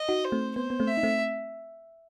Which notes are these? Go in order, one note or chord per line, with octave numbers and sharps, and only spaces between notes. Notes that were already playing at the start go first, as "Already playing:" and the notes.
Already playing: D#5
D#4 F#4
C5
A3 C4
B3 C5
B3
A3 C4
E5
D#4
A3 C4